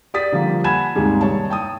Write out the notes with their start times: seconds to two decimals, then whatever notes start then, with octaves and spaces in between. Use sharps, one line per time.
0.14 G4 D5 D#6 A6 B6
0.32 D3 F3 G3 A#3
0.64 F#5 G#5 A5 B5 G#6 E7
0.95 D#2 G#2 C3 G3 G#3
1.21 G2 C#5 A5
1.50 G5 A5 D#6